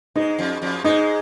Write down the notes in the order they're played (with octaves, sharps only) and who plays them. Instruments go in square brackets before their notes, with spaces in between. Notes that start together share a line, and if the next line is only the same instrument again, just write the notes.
[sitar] G#2 G#3 [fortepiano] D#4
[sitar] F2 F3
F2 F3
[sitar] G#2 G#3 [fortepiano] D#4